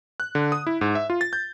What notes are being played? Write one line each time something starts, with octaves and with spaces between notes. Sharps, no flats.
F#6
D3
D#6
E4
G#2
E5
F4
A6
G6